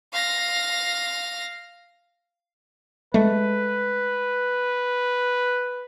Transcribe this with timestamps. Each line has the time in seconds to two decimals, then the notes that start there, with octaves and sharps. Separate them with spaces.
0.13 F5 A#6
3.14 G#3 A3 B4